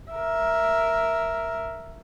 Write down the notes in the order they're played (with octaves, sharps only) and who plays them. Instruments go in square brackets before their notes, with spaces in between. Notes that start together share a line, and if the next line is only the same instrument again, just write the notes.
[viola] A#4 E5